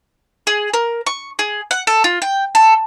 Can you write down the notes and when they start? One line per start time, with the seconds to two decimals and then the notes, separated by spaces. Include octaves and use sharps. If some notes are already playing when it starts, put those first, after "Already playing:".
0.47 G#4
0.73 A#4
1.06 C#6
1.39 G#4
1.71 F#5
1.87 A4
2.04 F4
2.22 G5
2.55 A4